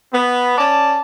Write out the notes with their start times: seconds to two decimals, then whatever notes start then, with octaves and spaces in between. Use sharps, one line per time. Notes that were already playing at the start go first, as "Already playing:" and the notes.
0.13 B3
0.58 C#4 D5 A5